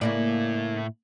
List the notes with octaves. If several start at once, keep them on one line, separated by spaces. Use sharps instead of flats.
A2 C#3 A#3 E4 D5